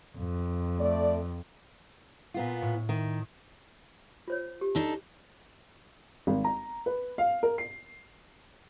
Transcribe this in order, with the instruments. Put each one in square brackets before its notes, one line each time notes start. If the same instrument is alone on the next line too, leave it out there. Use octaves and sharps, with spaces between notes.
[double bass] F2
[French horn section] A3 D5
[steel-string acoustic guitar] A#2 B3 F4
[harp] A2
[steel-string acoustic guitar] D#3 [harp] E5
[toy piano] F4 C5 C#5
G4
[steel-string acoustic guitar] D4 D#4 A4
[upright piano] G#1
A#5
B4
F5
A#4
C7